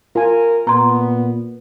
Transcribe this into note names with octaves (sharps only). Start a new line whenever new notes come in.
F4 A#4 G#5
A#2 B3 A#5 C6